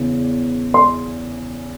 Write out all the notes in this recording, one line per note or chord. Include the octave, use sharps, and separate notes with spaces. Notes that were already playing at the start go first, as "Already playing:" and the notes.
Already playing: E2 C#3
C6